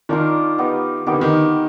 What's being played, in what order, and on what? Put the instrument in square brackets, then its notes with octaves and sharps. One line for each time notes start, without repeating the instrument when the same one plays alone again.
[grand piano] D#3 [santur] D4 F4 A#4
[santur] B3 D#4 G4
[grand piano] D#3 [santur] B3 D#4 G4
[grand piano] D3
D#3